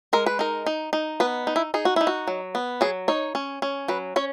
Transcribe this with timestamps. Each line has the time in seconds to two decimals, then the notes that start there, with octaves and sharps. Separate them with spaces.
0.13 G#3 A#4
0.26 B4
0.39 D#4 A#4
0.66 D#4
0.93 D#4
1.20 B3 B4
1.47 D#4
1.56 E4
1.74 D#4 G#4
1.85 F#4
1.96 D#4 E4
2.07 F#4
2.27 F#3
2.55 B3
2.81 F#3 G#4
3.08 D#4 C#5
3.35 C#4
3.62 C#4
3.88 F#3 B4
4.16 C#4 C#5